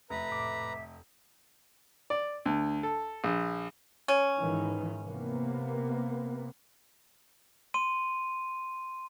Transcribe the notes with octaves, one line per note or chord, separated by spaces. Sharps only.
F1 A3 B4 E5 A#5
C#2 A2 D6
D5
D2
A4
A#1
C#4
G#2 D#3 E3
C3 A#3 B3
C6 D#7